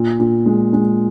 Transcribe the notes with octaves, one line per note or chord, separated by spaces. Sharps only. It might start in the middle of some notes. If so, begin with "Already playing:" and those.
Already playing: A#2
A#2
G#3
G#3